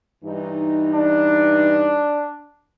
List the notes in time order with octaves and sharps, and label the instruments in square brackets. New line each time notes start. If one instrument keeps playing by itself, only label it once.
[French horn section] G2 E3 D#4
[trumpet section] D4